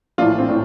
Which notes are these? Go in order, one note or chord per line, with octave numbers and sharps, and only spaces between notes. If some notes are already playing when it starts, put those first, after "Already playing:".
A#1 A2 E3 D4 F4
C4
A2 E3 D4